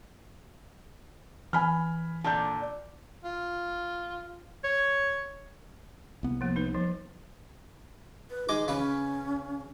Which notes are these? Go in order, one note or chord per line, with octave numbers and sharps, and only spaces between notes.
E3 G#5 B5 F6
A#2 D3 D5 A5 G6
F4
C#5
C2 B3
F3 A#3
D#4 B4
F3 G3
B4
G#3 D#4 D#5 D6
C#3 C#4 B4 B5